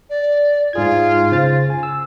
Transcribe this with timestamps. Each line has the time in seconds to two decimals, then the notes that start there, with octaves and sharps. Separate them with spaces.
0.10 D5
0.73 G#2 F4 G#4 G#6
1.31 C#3 C5 A6
1.70 G#5
1.83 E6